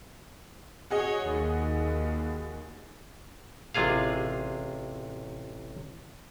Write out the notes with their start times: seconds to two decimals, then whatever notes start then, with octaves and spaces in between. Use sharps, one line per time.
0.90 F#4 G#4 C#5 D#5
1.29 D#2
3.74 A1 C3 F4 G#4 F5